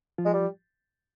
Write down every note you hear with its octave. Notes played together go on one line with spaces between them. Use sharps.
F3 F4
G#3
G3